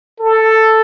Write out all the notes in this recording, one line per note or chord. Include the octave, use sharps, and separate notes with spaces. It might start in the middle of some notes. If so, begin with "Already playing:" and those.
A4